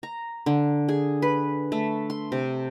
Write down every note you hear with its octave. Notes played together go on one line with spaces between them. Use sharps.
A#5
D3
G#4
B4
A3
C6
C3